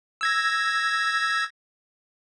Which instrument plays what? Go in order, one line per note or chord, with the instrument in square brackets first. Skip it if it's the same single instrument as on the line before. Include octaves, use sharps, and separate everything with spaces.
[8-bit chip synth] E6 G#6 A#6